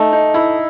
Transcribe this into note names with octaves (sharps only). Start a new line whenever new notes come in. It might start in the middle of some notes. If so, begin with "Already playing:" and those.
Already playing: A3 D#4
D#4
E4